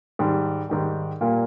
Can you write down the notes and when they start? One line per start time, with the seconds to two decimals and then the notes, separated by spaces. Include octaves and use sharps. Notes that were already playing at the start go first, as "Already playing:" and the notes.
0.19 G#2 D#3 G3
0.69 G#2 D#3 G3
1.21 A#2 G3 A#3